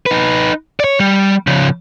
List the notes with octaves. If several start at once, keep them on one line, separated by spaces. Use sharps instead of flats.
D#4 B4
C#5 D5
G3
C#3 F3